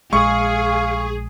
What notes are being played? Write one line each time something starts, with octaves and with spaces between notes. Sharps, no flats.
A#1 G#3 G#4 F5 C#6